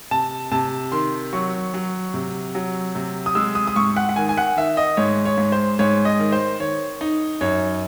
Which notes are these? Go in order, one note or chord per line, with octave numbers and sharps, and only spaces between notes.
C3 A5
C3 A5
D#3 C6
F#3 C#6
F#3
C3
F#3
C3
D#6
G#3 E6
D#6
D#6
G#2 C#6
F#5
F#5
D#3 G#5
G#5
F#5
D#3 E5
D#5
G#2 C#5
C#5
G#2
C5
G#2 C#5
D#5
D#3
C5
D#3 C#5
D#4
F#2 C#5